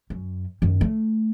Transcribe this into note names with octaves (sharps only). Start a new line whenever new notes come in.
F#2
F#2 D#3
A3